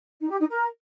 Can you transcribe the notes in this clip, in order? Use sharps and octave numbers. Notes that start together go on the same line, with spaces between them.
D#4
G4
D#4
A#4